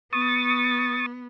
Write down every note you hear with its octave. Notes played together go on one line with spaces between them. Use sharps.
B3 C#6 D#6 A6